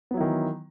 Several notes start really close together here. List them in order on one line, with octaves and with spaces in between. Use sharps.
B3 F#3 E4 D#3 E3